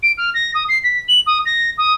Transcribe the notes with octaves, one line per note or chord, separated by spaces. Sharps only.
D7
F6
A#6
D#6
C7
B6
F#7
D#6
A#6
D#6